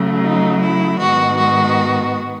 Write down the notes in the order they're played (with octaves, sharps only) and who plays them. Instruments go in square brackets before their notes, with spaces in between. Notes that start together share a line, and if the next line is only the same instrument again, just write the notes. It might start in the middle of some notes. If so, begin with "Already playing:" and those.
Already playing: [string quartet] C#3 F#3 A3
D#4
E4
G#2 D#3 G#3 B3 F#4
F#4